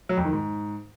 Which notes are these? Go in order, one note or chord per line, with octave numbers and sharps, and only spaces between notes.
F#3
F2
D#3
G#2